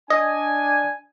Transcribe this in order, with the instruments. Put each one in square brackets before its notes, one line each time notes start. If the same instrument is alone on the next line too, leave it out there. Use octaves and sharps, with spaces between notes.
[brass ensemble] D4 G#5 [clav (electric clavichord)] D#5